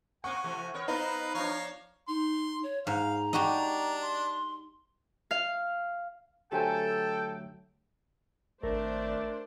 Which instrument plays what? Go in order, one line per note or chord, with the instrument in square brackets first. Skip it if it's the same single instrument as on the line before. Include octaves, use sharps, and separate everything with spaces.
[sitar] A#3 C4 [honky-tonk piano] F#5 C#6 [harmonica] G#5
[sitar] C3 E3 A3
B3 A#4 C#5
[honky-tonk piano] B3 D#4 [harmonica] B4 F5 A#5 [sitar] C5
[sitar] F3 D4 [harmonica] C#5 F5 A#5
[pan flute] D#4 [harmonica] C6
[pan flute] C#5
[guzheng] G#2 [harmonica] F5 [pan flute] A#5
[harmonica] D4 [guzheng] D#4 F#4 G4
[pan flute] C6
[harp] F5
[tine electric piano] D3 F#3 A3 [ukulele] G4 C5 G#5 [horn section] A4 [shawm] G5
[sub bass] G#1 [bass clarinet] A3 [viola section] D4 C5 D5 [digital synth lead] A#4